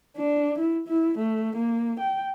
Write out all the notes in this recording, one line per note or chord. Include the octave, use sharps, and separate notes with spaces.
D4
E4
E4
A3
A#3
G5